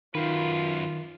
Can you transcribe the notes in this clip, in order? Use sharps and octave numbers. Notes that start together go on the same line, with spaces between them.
F#2 D#3 F4 B4